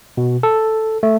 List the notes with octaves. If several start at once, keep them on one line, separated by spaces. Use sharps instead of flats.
B2
A4
A3